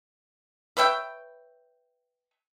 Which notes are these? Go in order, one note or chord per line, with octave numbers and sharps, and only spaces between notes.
B4 C#5 E5 G5